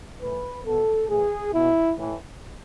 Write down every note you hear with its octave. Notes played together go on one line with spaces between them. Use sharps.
A2 E3 B4
B2 A4
A2 E3 G#4
B2 E4
A2 E3